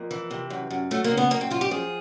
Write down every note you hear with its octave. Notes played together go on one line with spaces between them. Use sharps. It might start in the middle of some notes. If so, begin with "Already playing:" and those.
Already playing: F2 A#3
E3
C3
F#2
F#2
F#3 A3
A#3
C#3
B3
F#2 A#3
C4
F#2 F4
G4
F3 G#4